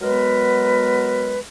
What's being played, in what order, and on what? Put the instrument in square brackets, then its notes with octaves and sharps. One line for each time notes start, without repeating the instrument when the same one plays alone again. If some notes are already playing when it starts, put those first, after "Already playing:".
[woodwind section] F#3 G#3 B3 A#4 B4